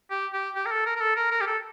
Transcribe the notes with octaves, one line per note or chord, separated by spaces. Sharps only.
G4
G4
G4
A#4
A4
A#4
A#4
A4
A#4
A#4
G4
A4